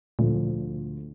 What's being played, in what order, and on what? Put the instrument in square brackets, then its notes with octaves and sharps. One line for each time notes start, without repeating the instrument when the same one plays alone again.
[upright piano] D2 D3 F3 [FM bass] A#2